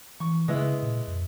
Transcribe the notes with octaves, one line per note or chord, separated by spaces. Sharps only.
E3 C#6
C#3 G#3 B3 E4
A#2
F2